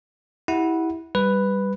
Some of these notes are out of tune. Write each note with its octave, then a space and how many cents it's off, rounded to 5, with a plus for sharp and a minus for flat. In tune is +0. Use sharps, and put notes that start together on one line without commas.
E4 -15 G4 +0 F#5 +0
G3 +0 B4 +5